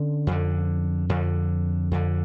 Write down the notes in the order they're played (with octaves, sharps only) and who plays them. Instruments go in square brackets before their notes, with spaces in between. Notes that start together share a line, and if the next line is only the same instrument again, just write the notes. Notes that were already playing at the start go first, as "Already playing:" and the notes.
Already playing: [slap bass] D3 C#4
F2 D3
F2 D3
F2 D3